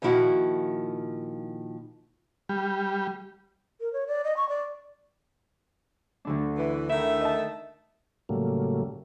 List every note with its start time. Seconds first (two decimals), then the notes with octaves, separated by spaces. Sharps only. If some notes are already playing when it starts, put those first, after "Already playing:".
0.02 A#2 D#3 F3 E4 F#4
2.49 G3
3.81 A#4
3.93 C#5
4.07 D5
4.24 D#5
4.37 C#6
4.49 D5
6.25 D2 D3 D4
6.57 E3
6.89 D#3 A3 E4 E5
7.21 D#5 A5
8.29 A2 C#3 F#3 G3 A3 A#3